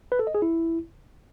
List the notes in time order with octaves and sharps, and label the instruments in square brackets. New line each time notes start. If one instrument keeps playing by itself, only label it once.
[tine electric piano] B4
A4
D#5
G#4
E4